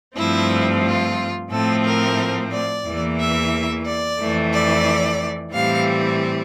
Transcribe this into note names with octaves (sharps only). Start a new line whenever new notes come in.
G2 F3 A3 C4 E4
F4
A2 F3 A3 C4 A4
A#4
D5
E2 E3 A#3
E5
D5
F2 E3 A3
D5
A2 E3 G3 C4 F5